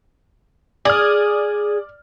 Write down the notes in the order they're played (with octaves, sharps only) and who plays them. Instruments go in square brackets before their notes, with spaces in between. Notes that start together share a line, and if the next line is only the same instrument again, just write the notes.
[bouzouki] G#4 [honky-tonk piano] D5 F6